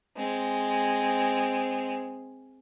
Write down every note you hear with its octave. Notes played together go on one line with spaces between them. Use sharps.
G#3 C4